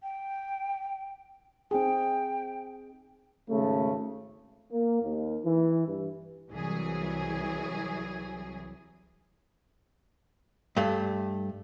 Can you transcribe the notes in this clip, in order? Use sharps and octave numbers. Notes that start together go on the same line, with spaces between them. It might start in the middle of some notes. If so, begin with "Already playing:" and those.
G5
C4 D#4 G#4 G5
G#1 C#3 A3
A#3
D#2
E3
G2
C2 E3 F#3 G#4
G2 A3